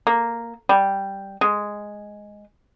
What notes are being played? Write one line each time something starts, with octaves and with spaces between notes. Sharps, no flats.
A#3
G3
G#3